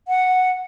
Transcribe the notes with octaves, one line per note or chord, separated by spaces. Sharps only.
F#5